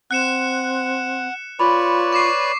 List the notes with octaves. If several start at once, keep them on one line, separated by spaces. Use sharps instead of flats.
C4 F#5 F#6 C#7 E7
F4 B4 C#5 D5 B5
C#6 D6 C7